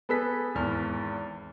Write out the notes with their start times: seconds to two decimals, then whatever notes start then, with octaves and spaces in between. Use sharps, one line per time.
0.09 B3 G#4 A4 B4 B6
0.55 G#1 E2 F6